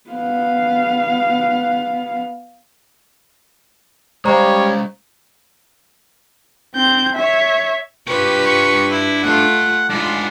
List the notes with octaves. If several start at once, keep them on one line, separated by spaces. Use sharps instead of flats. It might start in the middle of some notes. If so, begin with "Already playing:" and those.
B3 F5
G3 G#3 C5 C#5 F5 A#5
C4 G6
C#5 E5
D4 F4 G4 B4 G5 C#6
C#6
E4
A3 F4 F#5
G#2 B3 D4 F4